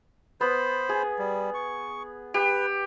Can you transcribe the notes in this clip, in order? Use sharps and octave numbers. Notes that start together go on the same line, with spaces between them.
B3 C5 B5
G#4
G3
C#6
G4 B4